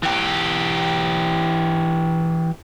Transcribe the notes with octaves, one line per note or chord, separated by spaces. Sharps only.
E3 G4